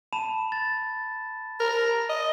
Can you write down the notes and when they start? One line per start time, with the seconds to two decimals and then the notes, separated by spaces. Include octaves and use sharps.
0.13 A5 B5 E7
0.52 A6
1.60 A#4
2.09 D#5